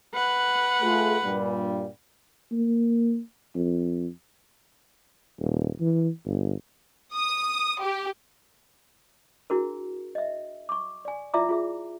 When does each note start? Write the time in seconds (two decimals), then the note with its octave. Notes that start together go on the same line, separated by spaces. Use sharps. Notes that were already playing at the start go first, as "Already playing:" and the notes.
0.14 B4 F#5
0.82 A3 F4 G#4
1.24 G2 A#2 G3
2.52 A#3
3.55 F2
5.40 D#1
5.80 E3
6.26 G1
7.15 D#6
7.81 G4
9.50 D4 E4 F#4 G#4 A#4
10.15 D#5 E5
10.69 C#6 D6
11.05 D5 G#5
11.34 E4 F4 D5 E5 A#5 D6
11.49 F4 G#4 E5